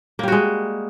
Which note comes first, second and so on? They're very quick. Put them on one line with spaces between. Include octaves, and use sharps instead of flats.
A#3 G3 F#4 G#3